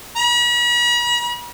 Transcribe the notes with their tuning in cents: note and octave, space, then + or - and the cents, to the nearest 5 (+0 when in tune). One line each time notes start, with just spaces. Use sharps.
B5 -45